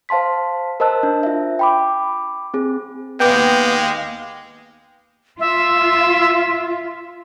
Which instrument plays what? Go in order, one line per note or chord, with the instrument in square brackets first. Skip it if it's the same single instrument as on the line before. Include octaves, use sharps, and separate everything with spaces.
[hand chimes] C5 F5 A5 C6 B6
A#4 C5 D#5 A5 E6 F#6
D4
F4 E5
G5 B5 D6
C4 G#4
[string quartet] D#2 F5 A#6 [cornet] G#3 [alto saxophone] B3 [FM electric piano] G5 D6
[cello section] F4 [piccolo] E5